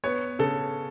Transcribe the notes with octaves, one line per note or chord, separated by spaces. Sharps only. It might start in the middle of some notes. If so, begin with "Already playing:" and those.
B3 C#5
C#3 A4